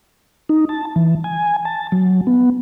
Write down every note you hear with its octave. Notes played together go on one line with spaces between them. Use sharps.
D#4
A5
E3
G#5
A5
F#3
B3